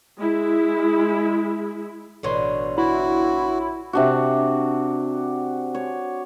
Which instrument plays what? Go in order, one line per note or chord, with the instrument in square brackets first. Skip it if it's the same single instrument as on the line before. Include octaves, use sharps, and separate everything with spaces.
[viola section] G#3 E4
[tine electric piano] A1 C#5 C6 [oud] B2 D3
[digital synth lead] E4 [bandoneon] F#4
[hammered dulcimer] C3 D4 F#4
C#5